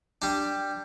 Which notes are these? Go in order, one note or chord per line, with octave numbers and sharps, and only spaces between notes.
G3 D4